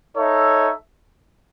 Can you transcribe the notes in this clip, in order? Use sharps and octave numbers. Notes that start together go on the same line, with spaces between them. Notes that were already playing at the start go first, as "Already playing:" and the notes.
D#4 A4 C#5 E5